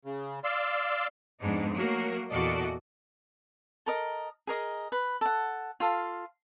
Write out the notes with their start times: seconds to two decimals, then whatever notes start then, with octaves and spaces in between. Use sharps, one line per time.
0.05 C#3
0.44 D5 F5 C6 E6
1.41 F2 G#2 B3 D4 D#4
1.75 F#3 A3 A#3 F#4 A#4
2.29 E2 A#2 F#4 A4 D5 D#5
3.86 A4 A#4 D#5
4.47 G#4 A#4 D#5
4.92 B4
5.21 A4 F#5
5.80 F4 A4 F5